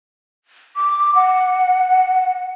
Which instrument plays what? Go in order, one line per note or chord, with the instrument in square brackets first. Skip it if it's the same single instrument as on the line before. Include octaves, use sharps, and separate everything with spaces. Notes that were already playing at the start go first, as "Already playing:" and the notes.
[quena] D6
F#5